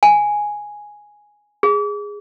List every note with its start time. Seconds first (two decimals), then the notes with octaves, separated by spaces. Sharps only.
0.03 G#5
1.63 G#4